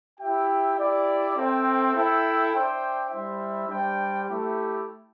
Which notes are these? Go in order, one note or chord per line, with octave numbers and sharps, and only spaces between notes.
E4 G4 E5 G5
E4 G4 D5
C4 A4 C5 E5 G5
E4 A4 E5 G5
D4 C5 E5 G5
G3 E4 C5 E5
G3 D4 C5 G5
A3 E4 G4